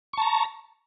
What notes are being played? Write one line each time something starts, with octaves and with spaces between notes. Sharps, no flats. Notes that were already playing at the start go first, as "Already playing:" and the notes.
A5 A#5 C#6